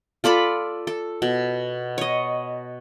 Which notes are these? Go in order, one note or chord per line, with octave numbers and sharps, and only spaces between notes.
F4 A4 D5 B5
A4
B2
C#5 D#5